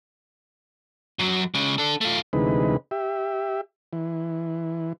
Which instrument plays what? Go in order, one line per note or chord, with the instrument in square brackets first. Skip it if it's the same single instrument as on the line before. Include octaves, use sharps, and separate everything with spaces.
[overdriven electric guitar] F#2 F#3
C#3 G#3
D4 A4
A3 F4
[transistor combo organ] D2 C3 E3 G#3 D#4 B4
G4 E5
E3